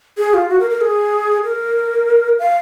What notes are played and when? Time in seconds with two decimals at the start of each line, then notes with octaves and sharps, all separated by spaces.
0.18 G#4
0.34 F4
0.49 F#4
0.60 A#4
0.70 A#4
0.81 G#4
1.44 A#4
2.39 F5